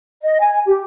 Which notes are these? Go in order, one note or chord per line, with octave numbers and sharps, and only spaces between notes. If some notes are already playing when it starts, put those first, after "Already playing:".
D#5
G#5
G4